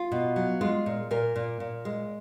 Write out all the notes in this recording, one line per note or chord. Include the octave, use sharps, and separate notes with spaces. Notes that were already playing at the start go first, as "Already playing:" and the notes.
Already playing: F4
B2
F#3
G#3 F4
A#2
A#2 A#4
A#2
A#2
G#3